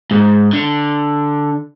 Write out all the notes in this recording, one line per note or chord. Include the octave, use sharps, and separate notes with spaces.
G#2
D3